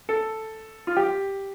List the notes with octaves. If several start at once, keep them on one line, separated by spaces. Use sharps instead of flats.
A4
F4
G4